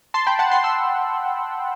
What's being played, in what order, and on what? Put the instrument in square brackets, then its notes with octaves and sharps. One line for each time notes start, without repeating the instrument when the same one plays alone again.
[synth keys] A5 C6
G5 B5
F#5 A5
A5 C6
C6 E6